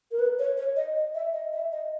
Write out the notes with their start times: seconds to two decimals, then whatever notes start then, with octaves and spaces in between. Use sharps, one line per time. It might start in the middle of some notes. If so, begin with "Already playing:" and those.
0.11 A#4
0.19 B4
0.39 C#5
0.57 C#5
0.76 D#5
0.96 D#5
1.15 E5
1.33 D#5
1.53 E5
1.72 D#5